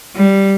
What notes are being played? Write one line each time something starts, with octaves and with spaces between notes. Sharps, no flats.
G3